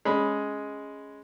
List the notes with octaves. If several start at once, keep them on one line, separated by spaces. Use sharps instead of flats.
G#3 C#4 B5